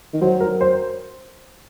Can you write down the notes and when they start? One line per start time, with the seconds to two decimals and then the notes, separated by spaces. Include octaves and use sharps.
0.13 D#3
0.21 F#3 C5
0.40 A#4
0.61 C5